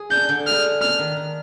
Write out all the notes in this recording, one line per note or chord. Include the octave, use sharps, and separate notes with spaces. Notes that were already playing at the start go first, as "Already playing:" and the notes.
Already playing: G#4
D4 G6
D3
G#4 F6
G#3
D4 F6
D#3
D#3